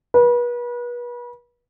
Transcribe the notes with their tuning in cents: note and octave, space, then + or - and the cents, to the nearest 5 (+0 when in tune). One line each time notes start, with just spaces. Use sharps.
B4 -35